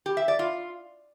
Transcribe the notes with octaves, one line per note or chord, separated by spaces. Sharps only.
G4
E5
D5
F4